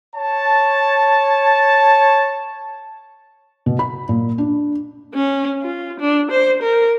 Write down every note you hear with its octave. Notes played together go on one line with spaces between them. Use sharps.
C#5 A5
B2
B5
A#2
D4
C#4
F4
D4
C5
A#4